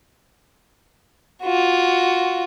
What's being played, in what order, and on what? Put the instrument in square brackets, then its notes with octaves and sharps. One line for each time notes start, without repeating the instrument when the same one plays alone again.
[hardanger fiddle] F4 F#4